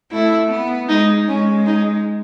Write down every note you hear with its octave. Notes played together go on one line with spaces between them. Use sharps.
A3 E4
B3
G#3 D#4
G#3 C#4
D#4